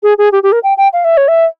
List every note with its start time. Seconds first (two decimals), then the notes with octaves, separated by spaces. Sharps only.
0.03 G#4
0.18 G#4
0.32 G4
0.43 G4
0.52 A#4
0.63 G5
0.77 G5
0.93 F5
1.04 E5
1.17 C#5
1.28 E5